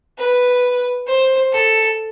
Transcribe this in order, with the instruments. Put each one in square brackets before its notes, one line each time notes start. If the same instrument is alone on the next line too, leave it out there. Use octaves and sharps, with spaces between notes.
[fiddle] B4
C5
A4